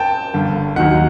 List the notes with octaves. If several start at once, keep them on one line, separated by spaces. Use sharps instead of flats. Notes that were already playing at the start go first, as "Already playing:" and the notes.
Already playing: G5 A5
G1 G2 D3
D#2 D#3 F#3 A#3 D#4 F#5